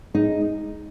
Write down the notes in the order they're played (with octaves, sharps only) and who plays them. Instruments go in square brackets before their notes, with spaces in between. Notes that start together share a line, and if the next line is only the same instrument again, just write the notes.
[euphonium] G#3 [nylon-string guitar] D#4